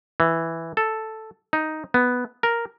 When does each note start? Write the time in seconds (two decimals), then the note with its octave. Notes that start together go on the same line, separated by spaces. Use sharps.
0.20 E3
0.77 A4
1.53 D#4
1.94 B3
2.43 A#4